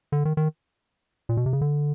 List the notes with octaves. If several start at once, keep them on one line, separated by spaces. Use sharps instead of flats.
D3
D#3
D#3
A#2
B2
C3
C#3
D3